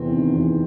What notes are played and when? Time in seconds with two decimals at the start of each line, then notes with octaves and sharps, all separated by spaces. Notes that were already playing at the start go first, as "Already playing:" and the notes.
Already playing: E2 C3 C4
0.12 D#3
0.34 E2